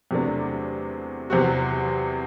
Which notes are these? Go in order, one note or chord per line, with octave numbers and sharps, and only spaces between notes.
E2 C3 F#3 A3 D4
E2 C3 F#3 C4 F#4